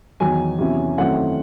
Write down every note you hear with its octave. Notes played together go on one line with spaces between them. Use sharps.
E2 D#3 F#3 G#5
E2 C3 F#3 C#4 E4
F#2 D#3 A3 C4 E4 F#5